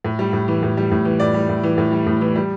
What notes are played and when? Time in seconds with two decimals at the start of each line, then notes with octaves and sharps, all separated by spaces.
0.05 A2
0.19 G3
0.33 A2
0.48 E3
0.63 A2
0.77 G3
0.92 A2
1.05 E3
1.20 A2 D5
1.34 G3
1.49 A2
1.63 E3
1.78 A2
1.92 G3
2.07 A2
2.21 E3
2.36 G3